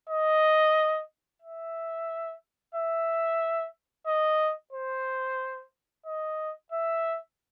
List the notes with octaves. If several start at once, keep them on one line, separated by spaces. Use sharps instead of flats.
D#5
E5
E5
D#5
C5
D#5
E5